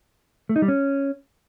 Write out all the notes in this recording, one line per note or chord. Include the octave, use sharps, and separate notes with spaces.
A3
D#4
G3
C#4